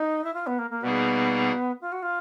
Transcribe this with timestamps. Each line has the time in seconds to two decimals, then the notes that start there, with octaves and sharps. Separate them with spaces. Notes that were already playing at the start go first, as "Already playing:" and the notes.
Already playing: D#4
0.24 E4
0.34 F4
0.47 B3
0.59 A#3
0.70 A#3
0.83 B2 G3 A#3 B3 D#4 G#4
1.81 F4
1.92 F#4
2.02 F4